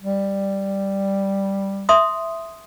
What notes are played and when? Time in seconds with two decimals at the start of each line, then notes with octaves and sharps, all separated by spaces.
0.01 G3
1.89 E5 C6 D#6